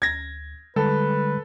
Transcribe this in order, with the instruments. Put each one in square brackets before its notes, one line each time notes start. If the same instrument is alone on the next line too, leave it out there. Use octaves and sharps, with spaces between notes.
[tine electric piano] D2 [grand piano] G#6 A#6
[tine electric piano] D3 G3 G#3 [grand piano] A4 [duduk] B4